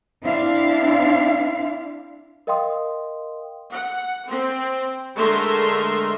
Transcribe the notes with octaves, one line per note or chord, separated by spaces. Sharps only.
C4 D4 E4 F5
A#4 D#5 F5 G5 C6 D#6
F#5
C4
D3 G#3 A3 A#4 E5 C6